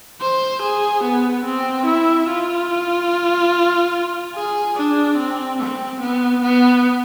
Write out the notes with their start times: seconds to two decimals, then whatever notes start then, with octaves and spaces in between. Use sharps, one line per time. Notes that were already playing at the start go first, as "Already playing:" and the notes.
0.21 C5
0.63 G#4
1.04 B3
1.45 C4
1.86 E4
2.28 F4
4.35 G#4
4.76 D4
5.18 C4
5.58 C4
6.01 B3
6.42 B3